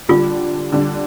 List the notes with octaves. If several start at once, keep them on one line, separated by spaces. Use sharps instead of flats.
D3 G3 D4 F4
D3 G3 D4